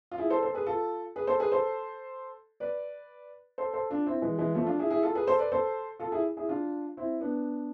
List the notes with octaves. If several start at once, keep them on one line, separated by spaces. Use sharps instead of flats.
F4
E4 G#4
A4 C5
A4 C5
G#4 B4
F4 A4
G#4 B4
A4 C5
G#4 B4
A4 C5
B4 D5
A4 C5
A4 C5
D4 F4
C4 E4
E3 G#3
E3 G#3
F3 A3
D4 F4
E4 G#4
E4 G#4
F4 A4
G#4 B4
A4 C5
B4 D5
A4 C5
F4 A4
E4 G#4
E4 G#4
D4 F4
C4 E4
B3 D4